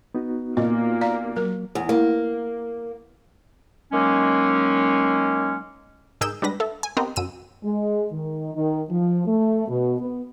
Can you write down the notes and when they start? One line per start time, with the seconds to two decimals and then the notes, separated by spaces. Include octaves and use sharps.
0.15 B3 D#4 F#4
0.57 A#2 A#3 D#5
1.01 D5 F5 A#5
1.36 F#3 A#4
1.75 E2
1.89 A#3
3.93 D#3 F#3 G#3 A#3 C#4
6.21 G#2 G#4 A#4 E6 G6 E7
6.42 G3 G#3 D4 B4 A#6
6.60 A4 E5
6.83 G#5
6.97 B3 C4 G4 A#4 C5 D#5
7.16 F#2 E6 D#7
7.63 G#3
8.12 D#3
8.55 D#3
8.90 F3
9.27 A3
9.68 B2
9.99 B3